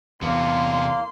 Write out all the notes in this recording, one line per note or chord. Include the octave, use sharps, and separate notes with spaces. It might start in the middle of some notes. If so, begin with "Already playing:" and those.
E2 C3 A#3 B3 C6